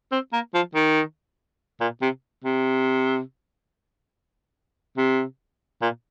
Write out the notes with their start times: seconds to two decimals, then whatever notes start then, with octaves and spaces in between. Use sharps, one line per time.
0.12 C4
0.33 A#3
0.54 F3
0.75 D#3
1.80 A#2
2.02 C3
2.44 C3
4.97 C3
5.82 A#2